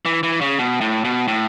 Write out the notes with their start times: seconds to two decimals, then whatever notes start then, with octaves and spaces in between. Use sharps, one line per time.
0.05 E3
0.23 E3
0.41 C#3
0.59 B2
0.81 A2
1.04 B2
1.28 A2